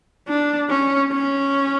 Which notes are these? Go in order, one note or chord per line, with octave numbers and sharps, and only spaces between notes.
D4
C#4
C#4